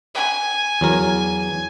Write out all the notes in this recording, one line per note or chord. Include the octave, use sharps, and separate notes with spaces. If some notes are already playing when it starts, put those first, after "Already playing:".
G#5
E2 F#3 A#4